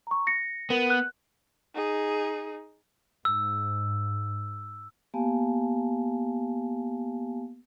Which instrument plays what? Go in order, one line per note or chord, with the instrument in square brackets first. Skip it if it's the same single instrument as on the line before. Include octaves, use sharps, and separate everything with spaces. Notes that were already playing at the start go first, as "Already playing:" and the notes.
[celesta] A#5 C#6
A#6 C#7
[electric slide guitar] B3 [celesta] A#4
[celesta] F#6
[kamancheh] D#4 G#4
[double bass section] G#2 [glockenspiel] E6
[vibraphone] A#3 B3 G4 F5 G#5 A5